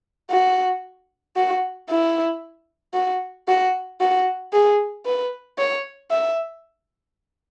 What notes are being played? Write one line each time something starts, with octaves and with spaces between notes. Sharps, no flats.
F#4
F#4
E4
F#4
F#4
F#4
G#4
B4
C#5
E5